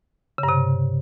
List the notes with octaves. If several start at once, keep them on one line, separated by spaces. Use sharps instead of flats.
C#3
G2
C3